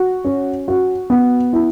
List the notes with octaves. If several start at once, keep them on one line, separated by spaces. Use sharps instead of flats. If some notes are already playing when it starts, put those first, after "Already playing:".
Already playing: F#4
C#4
F#4
B3
E4